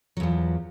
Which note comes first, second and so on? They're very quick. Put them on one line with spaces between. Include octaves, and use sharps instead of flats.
F#3 E2 F3